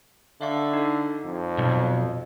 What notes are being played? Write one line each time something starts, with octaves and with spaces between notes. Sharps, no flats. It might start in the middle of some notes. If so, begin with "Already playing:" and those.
D3 E5 F5 C#6
D#4 A4
F2
B1